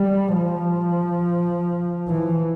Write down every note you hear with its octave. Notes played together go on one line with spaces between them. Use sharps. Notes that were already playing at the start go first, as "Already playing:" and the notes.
Already playing: G3
F3
E3